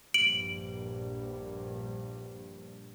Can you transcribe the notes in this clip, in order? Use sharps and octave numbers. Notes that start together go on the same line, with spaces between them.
A#1 G2 D7 F#7